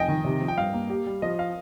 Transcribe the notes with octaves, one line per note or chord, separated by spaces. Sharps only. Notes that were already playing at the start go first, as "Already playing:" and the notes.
Already playing: F1 D#5 G5 G#5
D#3
C3
F3
G5
G2 F5
A#3
G4
G3
F3 D#5
F5